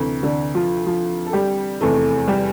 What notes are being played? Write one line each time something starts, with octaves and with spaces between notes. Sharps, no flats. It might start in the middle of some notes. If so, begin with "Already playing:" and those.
Already playing: D2 C3 E3
D3 D4
F3 F4
F3 F4
A4
G3 G4
F1 E2 C3 E3 A3 A4
G3 G4